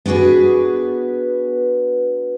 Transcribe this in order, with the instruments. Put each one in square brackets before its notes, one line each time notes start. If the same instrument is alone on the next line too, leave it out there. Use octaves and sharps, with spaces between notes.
[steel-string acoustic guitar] B3 D4 F#4 G#4 B4